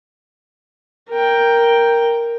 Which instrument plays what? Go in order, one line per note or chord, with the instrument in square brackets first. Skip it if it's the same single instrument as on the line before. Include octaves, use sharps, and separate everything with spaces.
[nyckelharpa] A#4 G5